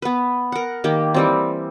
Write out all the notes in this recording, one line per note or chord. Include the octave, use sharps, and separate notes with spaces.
B3 B4
A#4 F#5
D#3 A#3 G4
E3 G3 C4